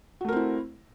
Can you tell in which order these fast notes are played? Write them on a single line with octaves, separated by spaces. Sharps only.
F#4 A3 A#4 C4 E4